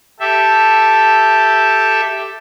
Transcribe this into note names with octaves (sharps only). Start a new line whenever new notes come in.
G4 A4 E5